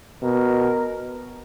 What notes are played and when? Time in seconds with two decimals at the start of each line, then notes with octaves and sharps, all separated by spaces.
0.22 B2 A#4